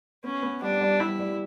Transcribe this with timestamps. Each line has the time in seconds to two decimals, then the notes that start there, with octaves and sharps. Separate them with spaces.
0.24 B3 C#4
0.43 B3
0.62 G3 D4
0.81 G3
1.00 G3 E4
1.19 G3